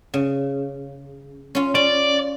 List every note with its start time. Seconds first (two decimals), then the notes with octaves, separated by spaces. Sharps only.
0.14 C#3
1.55 C#4 F4
1.75 C#4 D5